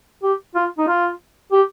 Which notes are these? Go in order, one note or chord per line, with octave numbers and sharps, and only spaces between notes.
G4
F4
D#4
F4
G4